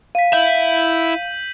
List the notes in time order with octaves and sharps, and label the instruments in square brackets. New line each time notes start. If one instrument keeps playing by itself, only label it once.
[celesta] F5 [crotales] B6 D#7
[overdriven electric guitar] E4 E5 [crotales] G6 F#7